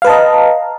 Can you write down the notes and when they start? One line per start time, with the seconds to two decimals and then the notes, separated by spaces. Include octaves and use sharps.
0.02 F5
0.04 B4
0.07 A5
0.10 D#5
0.12 A#5